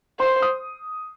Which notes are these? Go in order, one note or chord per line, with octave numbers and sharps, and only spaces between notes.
C5 C6
D#6